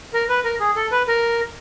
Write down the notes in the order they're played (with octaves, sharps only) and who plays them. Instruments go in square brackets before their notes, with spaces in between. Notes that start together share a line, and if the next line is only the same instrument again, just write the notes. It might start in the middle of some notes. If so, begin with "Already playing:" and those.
[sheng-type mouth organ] A#4
B4
A#4
G#4
A4
B4
A#4